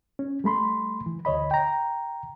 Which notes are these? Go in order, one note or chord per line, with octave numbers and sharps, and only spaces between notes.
C#4
G3 A3 B5 C6
E3
D2 C#5 D#5 B5
G5 A#5